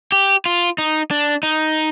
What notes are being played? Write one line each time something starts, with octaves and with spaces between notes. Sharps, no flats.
G4
F4
D#4
D4
D#4